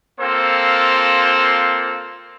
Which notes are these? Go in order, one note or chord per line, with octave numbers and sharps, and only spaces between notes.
A#3 C4 F4 A4 C5